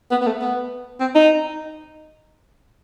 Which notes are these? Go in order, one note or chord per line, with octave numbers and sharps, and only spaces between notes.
B3
B3
A3
B3
C4
D#4